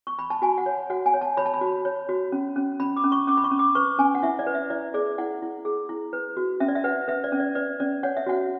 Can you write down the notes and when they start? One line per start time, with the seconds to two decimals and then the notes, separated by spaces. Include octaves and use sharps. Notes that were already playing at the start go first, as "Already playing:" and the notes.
0.07 C#6
0.19 B5
0.30 A5
0.42 F#4 G#5
0.58 F#5
0.66 C#5
0.90 F#4 F#5
1.06 G#5
1.14 C#5
1.21 A5
1.37 C#5 B5
1.46 A5
1.54 B5
1.61 F#4
1.85 C#5
2.09 F#4
2.32 C#4
2.56 C#4
2.80 C#4 B5
2.96 D6
3.04 C#4
3.12 C#6
3.27 C#4 D6
3.37 B5
3.44 C#6
3.51 C#4
3.59 D6
3.75 B4 C#6
3.98 C#4 G#5
4.15 F#5
4.23 E4 E5
4.39 D5
4.47 B4
4.55 E5
4.70 E4 D5
4.94 G#4 D5
5.18 E4 F#5
5.42 E4
5.65 G#4
5.89 E4
6.13 B4
6.37 F#4
6.60 C#4 E5
6.68 D5
6.75 E5
6.84 B4 F#5
7.08 B4 E5
7.24 D5
7.32 C#4
7.40 D5
7.55 B4 D5
7.80 C#4 D5
8.03 C#5 F#5
8.17 E5
8.26 F#4 F#5